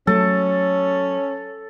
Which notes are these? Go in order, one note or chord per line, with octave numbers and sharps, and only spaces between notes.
F#3 A3 C#4 A4